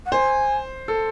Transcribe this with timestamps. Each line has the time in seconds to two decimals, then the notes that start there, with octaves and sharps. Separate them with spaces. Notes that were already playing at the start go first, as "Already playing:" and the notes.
0.06 F#5
0.12 C5 G#5
0.88 A4